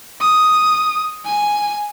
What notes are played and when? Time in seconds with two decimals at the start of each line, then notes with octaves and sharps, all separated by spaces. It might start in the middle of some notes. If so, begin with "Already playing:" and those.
0.21 D#6
1.25 G#5